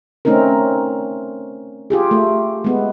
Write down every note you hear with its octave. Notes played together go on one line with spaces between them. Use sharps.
A3 C4 C#4 D#4 A#4
F4 G4 G#4
A3
G#3 B3